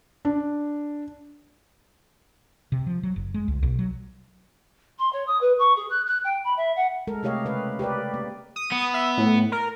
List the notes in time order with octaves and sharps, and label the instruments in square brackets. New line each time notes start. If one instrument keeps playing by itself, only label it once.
[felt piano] D4
[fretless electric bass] C3
F3
F#3
F#1
G#3
C#2
B1
F#3
[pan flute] C6
C#5
D#6
B4
C#6
G#4
F#6
F#6
G5
B5
E5
F#5
[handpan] G#3 A4 A#4
C3 A3 G4 C#5 D#5 F5
C#3 B4 F5
G4 A#4 B4 D5
A#3
[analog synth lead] D#6
[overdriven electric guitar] B3
[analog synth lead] E5
A2
A#4